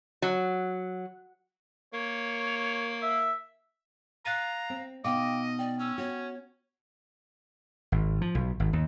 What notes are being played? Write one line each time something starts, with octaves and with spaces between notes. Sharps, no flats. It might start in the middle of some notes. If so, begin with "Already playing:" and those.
F#3
A#3 C#5
E5
F5 A#5 F#6 A6 D#7
C4
B2 D#4 D#5 F5 G5 D6
D5 G5
C#4 E6
F#4 C#5
G#1
F3
B1
G#1
D#2